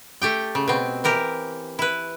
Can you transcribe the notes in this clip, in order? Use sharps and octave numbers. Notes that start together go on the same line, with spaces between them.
A3 G4 G5
C#3
B2 C4
E3 G4 A#4
E4 B4